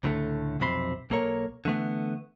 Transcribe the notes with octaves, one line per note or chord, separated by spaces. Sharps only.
C#2 A2 D3 G#3 A3
B1 F2 C3 C4 B5 C6
B1 A#3 A4 A#4 C#5
D3 E3 A3 B3